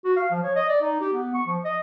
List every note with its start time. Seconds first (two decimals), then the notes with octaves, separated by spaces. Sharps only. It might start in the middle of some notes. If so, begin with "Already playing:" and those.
0.05 F#4
0.17 F5
0.31 F3
0.43 C#5
0.55 D#5
0.69 D5
0.82 D#4
1.01 G4
1.13 B3
1.34 C#6
1.47 F3
1.64 D#5